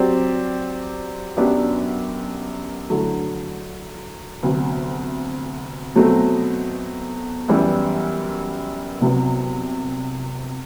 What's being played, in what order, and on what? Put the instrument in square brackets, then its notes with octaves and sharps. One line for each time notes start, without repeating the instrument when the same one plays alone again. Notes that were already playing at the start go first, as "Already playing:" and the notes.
Already playing: [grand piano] F#3 C4 G4 D5
F#2 F#3 B3 D4 G4
D3 F#3 A3 E4
D2 C3 F#3 B3
B2 F#3 A3 C4
F#2 E3 G3 B3
C2 C3 F#3 B3